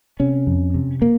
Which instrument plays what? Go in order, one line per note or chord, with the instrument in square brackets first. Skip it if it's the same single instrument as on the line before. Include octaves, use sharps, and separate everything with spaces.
[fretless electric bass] C3 C#4
F2
C3
A#3